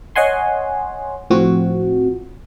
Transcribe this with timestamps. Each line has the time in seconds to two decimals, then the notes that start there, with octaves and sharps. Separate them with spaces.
0.16 C#5 D#5 F#5 G#5 C6
1.30 A2 F3 C4 F#4